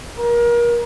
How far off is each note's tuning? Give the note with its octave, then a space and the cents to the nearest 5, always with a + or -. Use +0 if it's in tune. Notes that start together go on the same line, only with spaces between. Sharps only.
A#4 +30